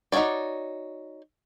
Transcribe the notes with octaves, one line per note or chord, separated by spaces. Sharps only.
D#4 F#4 A4 C#5 D5